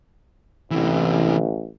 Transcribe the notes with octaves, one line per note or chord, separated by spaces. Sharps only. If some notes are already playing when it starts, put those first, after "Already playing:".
A1 C3 E3